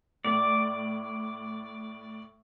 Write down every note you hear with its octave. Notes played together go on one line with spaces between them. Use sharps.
A2 D5